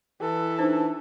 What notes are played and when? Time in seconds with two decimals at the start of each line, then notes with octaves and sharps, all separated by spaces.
0.21 E3 A4
0.59 D4 D#4 C5